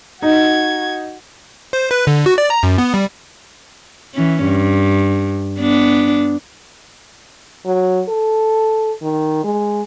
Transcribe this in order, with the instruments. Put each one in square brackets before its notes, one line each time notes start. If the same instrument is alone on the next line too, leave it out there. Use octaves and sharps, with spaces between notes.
[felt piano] D#4 [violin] F#4 G#6
[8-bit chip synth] C5
B4
D3
F#4
D5
A#5
F#2
B3
G3
[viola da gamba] E3 C#4
G2
B3 D4
[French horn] F#3
A4
D#3
G#3